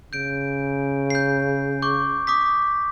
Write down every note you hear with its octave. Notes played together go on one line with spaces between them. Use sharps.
C#3 G6 D7
G6 C7
C#6 D6 G6
D6 D#6 B6